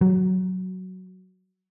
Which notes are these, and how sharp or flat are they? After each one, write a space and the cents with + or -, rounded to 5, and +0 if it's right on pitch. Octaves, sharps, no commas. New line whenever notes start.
F#3 +5